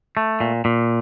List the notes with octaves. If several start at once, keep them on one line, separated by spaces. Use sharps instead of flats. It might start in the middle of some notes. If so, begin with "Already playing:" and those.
A3
A#2
A#2